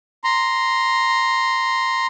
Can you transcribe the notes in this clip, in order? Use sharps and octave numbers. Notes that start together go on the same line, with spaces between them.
A#5 C6